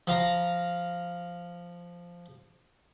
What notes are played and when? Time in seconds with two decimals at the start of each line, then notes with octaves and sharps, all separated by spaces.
0.07 F3 F5 A#5